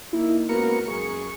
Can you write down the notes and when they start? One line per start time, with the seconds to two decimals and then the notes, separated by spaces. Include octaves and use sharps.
0.13 A#3 D#4 E4
0.49 C#2 C#3 A#3 B3 F#4 A#4 C#7
0.88 F#2 G#4 C#6